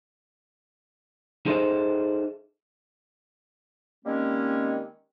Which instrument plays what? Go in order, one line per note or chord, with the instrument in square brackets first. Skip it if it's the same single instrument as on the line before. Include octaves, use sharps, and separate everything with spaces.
[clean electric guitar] D#4 G#4 A4 C5 D#5 E5
[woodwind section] D#3 G3 G#3 A#3 C4 C#4